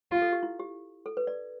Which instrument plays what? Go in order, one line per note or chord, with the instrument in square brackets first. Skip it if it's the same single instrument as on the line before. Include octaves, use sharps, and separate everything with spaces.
[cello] F4 [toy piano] G4
[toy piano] A4
G4
E4
G4
A4
B4
D5